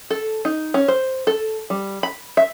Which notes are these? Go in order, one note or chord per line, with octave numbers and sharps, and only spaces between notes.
A4
D#4
C#4
C5
A4
G3
B5
E5